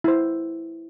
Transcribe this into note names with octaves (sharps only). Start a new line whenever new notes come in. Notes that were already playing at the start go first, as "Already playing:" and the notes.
E4 C5